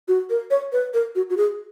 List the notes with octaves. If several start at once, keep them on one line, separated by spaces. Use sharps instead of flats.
F#4
A#4
C#5
B4
A#4
F#4
F#4
G#4